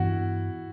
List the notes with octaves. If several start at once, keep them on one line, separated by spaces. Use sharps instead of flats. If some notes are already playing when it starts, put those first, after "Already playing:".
Already playing: G2 E3 B3 D4 E4 F#4